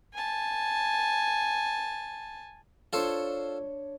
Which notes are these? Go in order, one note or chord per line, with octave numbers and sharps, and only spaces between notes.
G#5 A5
D4 F4 A4 C5 C#5